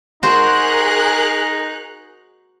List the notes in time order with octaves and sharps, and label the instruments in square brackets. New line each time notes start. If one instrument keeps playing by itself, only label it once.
[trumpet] D#4 [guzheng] F#4 C5 [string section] G#4 A#4 F#6